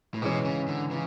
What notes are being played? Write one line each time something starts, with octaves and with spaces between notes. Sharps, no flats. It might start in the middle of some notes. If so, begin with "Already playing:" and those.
A2
G#2 B2 E3 G#3 C#4
C#3
D3
C#3 E3